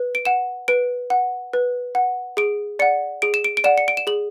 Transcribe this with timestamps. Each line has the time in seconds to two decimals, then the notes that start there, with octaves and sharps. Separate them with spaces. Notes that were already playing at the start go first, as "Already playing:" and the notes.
Already playing: B4
0.15 D7
0.25 F#5 E7
0.68 B4 D7
1.10 F#5
1.53 B4
1.95 F#5
2.37 G#4 D7
2.79 D5 F#5 C#7
3.22 G#4 D7
3.34 E7
3.44 D7
3.57 D7
3.64 D5 F#5 E7
3.78 C#7
3.88 D7
3.97 E7
4.07 G#4 F#7